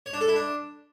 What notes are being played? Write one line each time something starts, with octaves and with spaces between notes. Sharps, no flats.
C#5
D4
A4
E4
D4